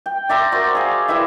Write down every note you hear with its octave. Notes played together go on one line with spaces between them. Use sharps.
G5
D5 E5 A#5 C6
F#4 A#4 C5 D5
G#4 F5
E4 G4 B4 E5